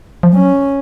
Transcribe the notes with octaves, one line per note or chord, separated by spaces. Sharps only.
F3
F#3 C#4